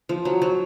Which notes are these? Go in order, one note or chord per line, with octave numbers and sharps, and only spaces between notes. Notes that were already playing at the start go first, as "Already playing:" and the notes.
F3
F#3
F#3